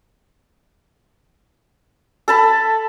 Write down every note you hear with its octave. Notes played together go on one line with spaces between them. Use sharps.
A4 A5 B5